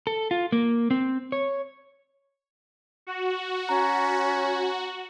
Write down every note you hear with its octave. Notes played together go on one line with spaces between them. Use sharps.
A4
F4
A#3
C4
C#5
F#4
C#4 A#5